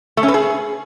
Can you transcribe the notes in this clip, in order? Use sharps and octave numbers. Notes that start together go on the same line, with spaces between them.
A3
C#4
B4
G#4